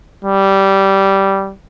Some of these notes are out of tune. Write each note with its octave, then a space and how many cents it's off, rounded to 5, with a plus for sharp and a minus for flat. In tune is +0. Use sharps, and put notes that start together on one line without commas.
G3 -10